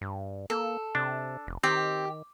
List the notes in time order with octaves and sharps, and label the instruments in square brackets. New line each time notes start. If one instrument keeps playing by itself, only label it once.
[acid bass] G2
[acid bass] A#3 [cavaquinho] A4
[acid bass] C3 [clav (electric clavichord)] D4
[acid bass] F1
[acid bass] D#3 [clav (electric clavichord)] C4 [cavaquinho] G4